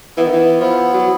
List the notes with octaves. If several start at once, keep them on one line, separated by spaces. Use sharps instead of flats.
E3 B3
D#3
E3
F3 E4
F#3